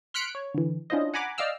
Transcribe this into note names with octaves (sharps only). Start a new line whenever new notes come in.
C6 F6 F#6 B6 C#7 D7
C#5
D3 E3
C#4 D4 E4 F4 C5 D#5
F#5 G#5 A#5 B5 D6
D5 D#5 F5 G5 E6 F6